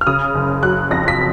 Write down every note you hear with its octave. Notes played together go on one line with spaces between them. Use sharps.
F6
C#3 D#6
F#1
F#3 F#6
F2 A#6
B6